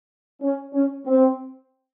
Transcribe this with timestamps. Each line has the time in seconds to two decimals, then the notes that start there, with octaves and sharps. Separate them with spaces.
0.42 C#4
0.74 C#4
1.06 C4